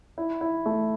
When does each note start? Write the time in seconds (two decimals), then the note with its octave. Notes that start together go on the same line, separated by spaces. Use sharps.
0.18 E4
0.41 E4
0.66 A3